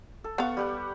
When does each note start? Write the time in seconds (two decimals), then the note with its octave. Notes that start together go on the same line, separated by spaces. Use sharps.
0.24 A4
0.38 B3 F5 F#5 C#6
0.57 G3 G4 F#5